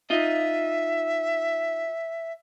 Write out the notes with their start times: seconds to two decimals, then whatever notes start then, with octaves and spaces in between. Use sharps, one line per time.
0.10 D#4 F4 D#5 E5